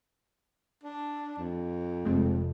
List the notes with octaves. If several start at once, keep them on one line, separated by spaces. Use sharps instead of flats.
D4
F2
F1 G#3 A3 C4